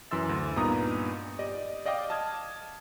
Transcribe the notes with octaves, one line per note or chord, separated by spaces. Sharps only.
F#2 E3 C6 E6 A6
D2
G2 A#2 B3 D#4 A#5 D#6
G4 D5 D#5
D5 D#5 F5 G5 D6
A5 D#6 F6 G#6